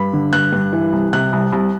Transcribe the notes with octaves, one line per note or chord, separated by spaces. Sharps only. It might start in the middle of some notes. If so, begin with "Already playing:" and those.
Already playing: G2 B5
D3
G2 F#6
G2
E3
C2
C3 F#6
C2
C2